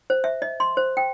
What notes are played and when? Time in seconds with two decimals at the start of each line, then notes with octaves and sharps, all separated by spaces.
0.10 C5
0.24 E5
0.42 D#5
0.60 C6
0.77 C5
0.97 G5